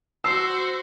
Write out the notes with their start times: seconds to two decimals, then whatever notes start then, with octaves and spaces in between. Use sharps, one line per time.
0.24 F#4 C5 E6 C7